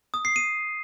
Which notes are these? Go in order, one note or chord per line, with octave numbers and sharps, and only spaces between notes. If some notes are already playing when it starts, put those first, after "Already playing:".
D#6
C7
D#7